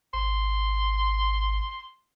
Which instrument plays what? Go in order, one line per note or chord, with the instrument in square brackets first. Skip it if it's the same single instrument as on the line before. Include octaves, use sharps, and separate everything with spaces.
[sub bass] G#1 [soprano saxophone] C6